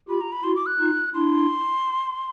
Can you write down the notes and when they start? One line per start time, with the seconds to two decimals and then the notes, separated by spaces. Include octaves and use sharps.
0.08 F4 G4 B5
0.21 A#5
0.32 B5
0.43 E4 F#4 C6
0.56 D6
0.67 F#6
0.79 D#4 F4
1.14 D4 E4 C6